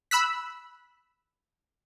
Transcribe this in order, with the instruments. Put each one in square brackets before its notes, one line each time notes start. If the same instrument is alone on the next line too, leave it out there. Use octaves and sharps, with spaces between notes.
[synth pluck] B5 E6 F#6 B6